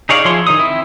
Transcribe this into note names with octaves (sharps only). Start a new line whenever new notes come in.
D#4 G#4 C#5 D5 F5
F3 E4 G#4 C#5 C6
D#3 D#4 D#6
C4 E4